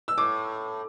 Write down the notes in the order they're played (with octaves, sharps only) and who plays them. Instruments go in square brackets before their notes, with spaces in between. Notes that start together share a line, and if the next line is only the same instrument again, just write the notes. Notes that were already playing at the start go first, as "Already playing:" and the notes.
[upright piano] E6
[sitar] A2 [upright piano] D6